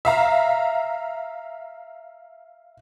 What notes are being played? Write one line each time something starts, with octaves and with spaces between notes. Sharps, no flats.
E5 F5 A#5